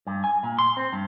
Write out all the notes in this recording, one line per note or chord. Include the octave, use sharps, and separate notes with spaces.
G2
G#5
A#2
C6
C4
G2